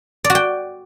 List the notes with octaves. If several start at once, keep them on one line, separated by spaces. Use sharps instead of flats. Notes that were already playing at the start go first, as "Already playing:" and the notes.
D5
F#4
G5